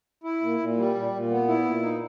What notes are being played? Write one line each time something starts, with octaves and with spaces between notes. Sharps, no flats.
E4
A#2
A#2
G3
A#2
A#2
B3
E4
A#2
D#4